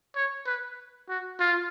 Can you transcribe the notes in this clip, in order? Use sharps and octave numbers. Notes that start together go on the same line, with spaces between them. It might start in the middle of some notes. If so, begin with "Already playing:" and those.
C#5
B4
F#4
F4